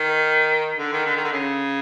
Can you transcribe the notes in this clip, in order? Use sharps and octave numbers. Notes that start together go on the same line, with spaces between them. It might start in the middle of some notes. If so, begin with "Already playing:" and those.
Already playing: D#3
D3
D#3
D3
D#3
D3
C#3